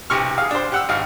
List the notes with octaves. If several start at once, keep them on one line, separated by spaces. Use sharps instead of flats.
B1 C3 C#6 F6
G#4 F5
D4 C5
G4 F#5 E6
G#1 F5